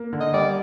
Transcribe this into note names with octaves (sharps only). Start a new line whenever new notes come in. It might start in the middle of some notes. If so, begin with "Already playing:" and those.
Already playing: A#3
D3
D#5
G3 D5